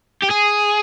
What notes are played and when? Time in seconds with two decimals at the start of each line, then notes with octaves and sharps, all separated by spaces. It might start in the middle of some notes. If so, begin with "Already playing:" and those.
0.23 G4
0.31 G#4